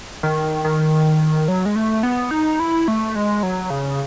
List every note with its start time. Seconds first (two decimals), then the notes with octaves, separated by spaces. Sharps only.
0.23 D#3
0.65 D#3
1.48 F#3
1.66 G#3
1.76 A3
2.03 B3
2.31 D#4
2.60 E4
2.88 A3
3.15 G#3
3.43 F#3
3.70 C#3